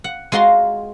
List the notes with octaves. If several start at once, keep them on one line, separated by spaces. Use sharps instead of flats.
F#5
G#3 F4 F#4 A#5 C6